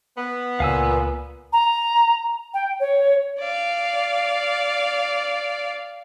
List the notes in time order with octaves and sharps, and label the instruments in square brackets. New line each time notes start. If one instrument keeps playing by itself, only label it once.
[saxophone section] B3
[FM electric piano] C#2 [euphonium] A#2 [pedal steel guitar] F5 G#5 E6
[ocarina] A#5
G5
C#5
[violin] D5 F5